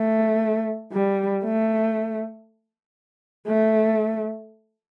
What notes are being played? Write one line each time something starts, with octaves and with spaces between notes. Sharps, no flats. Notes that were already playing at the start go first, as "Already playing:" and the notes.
Already playing: A3
G3
A3
A3